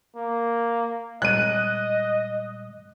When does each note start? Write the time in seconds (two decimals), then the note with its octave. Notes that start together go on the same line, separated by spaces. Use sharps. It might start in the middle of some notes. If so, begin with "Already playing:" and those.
0.16 A#3
1.22 A#2 G3 G#3 D#5 F#6 D#7